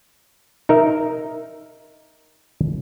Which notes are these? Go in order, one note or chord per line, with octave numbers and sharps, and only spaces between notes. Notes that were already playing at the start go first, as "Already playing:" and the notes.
D#4 A#4 E5